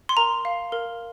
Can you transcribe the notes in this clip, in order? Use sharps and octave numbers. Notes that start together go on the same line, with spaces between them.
C6
A#4 A#5
F5
A#4